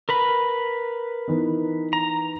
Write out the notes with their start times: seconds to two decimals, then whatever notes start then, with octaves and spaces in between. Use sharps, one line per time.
0.09 A#4 B4 B5
1.28 E3 B3 D#4
1.93 A#5